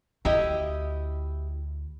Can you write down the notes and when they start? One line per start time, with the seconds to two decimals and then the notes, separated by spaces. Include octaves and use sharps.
0.25 D2 E4 G4 D#5